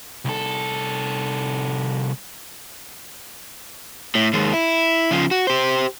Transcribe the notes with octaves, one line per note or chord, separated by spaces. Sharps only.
C2 A4
A2
D#2 G#3
E4
C#3 F3
F#4
G4 C5